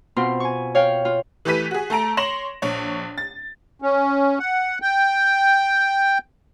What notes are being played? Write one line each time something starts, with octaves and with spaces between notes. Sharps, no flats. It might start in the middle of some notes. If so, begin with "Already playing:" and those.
B2 C4 F4 C6
G#5 C#6
C#5 F5 G5
F4
E3 A3 G4 B4 B6 D#7
F#4 G#4
A3 A4 A#5 D7
C#5 C6 A#6 E7 F#7
A#1 C#5
A6
C#4
F#5
G5